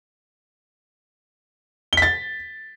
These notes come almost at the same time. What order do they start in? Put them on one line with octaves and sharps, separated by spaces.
G7 B6 A6